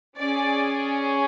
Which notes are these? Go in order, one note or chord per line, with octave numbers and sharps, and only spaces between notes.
C#4 G#4 D5